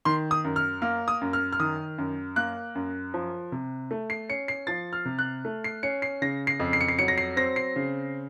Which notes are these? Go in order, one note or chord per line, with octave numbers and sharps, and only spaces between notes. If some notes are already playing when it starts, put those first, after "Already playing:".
D#3 C6
D#6
F#2
F6
A#3 F6
D#6
F#2
F6
F6
D#3 D#6
F#2
A#3 F#6
F#2
F3
C3
A3
C7
C#4 C#7
C7
F3 A6
F6
C3
F#6
A3
C7
C#4 C#7
C7
C#3 A#6
C7
F2
C7
C#7
C7
F#3 C#7
A#6
C7
C4 A#6
C7
C#3